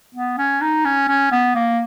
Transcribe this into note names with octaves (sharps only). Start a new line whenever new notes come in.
B3
C#4
D#4
C#4
C#4
B3
A#3